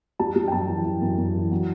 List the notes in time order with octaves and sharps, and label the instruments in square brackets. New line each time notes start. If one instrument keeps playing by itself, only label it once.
[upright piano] G3 A5
G3
G5
F#2 A5
E3
E3
F#2
F#2
E3
F#3